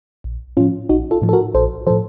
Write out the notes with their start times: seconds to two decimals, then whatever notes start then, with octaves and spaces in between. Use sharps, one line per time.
0.24 A#1
0.57 A2 F3 C#4 F4
0.89 A#1 D#4 F#4
1.11 F4 A4
1.22 A2 F3
1.29 A4
1.33 F#4 A#4
1.54 A#1 A4 C5
1.87 A2 F3 A4 C5